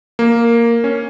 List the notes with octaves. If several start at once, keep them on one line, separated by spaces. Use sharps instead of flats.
A#3
C#4